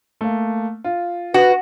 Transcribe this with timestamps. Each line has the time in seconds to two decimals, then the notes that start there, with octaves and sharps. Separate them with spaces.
0.21 A3 A#3
0.84 F4
1.34 F#4 B4 C#7